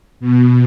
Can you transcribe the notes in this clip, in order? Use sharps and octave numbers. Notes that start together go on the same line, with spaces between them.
B2